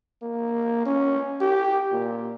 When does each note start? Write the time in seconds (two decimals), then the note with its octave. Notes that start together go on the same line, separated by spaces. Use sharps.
0.22 A#3
0.86 C#4
1.41 G4
1.92 A#2